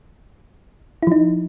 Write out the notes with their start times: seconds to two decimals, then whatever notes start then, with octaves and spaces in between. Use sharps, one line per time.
1.03 E4
1.07 F3
1.12 D#4